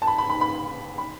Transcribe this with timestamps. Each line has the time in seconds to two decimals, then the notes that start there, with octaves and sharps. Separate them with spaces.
0.02 A5
0.07 B5
0.18 B5
0.30 B5
0.41 B5
0.98 B5